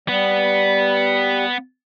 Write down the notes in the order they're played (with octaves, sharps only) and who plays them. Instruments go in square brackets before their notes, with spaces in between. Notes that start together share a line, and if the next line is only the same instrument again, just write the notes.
[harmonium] G3 [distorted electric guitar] B3